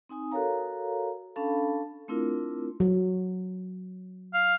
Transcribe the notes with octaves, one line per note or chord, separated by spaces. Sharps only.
C4 D#4 G#5 D#6
F#4 A4 A#4 C#5 F5 A#5
C#4 D4 A4 F5 A5 B5
A3 C4 D4 E4 F4 A#4
F#3
F5